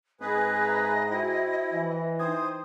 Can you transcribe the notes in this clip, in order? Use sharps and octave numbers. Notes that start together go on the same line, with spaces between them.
G#2 C4 G#4 B4 D#5
E5 A#5 A#6
E4 F#4 C5 G5
E3
D#4 C5 G5 D#6 G#6